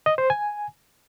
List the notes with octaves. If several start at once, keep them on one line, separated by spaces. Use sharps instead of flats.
D#5
C5
G#5